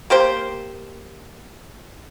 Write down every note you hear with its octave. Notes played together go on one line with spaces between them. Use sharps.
A#3 G4 C5